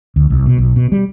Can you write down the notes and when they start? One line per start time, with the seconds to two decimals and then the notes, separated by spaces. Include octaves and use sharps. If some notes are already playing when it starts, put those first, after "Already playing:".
0.16 D2
0.30 C2
0.46 B2
0.58 B1
0.76 B2
0.92 G3